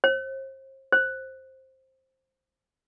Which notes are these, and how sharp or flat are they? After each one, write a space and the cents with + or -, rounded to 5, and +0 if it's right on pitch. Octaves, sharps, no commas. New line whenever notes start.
C5 +35
C5 +10